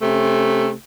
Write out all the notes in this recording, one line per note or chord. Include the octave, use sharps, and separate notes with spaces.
C3 A3 C#4